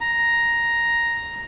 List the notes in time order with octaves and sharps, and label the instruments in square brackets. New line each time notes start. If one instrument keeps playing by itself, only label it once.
[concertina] A#5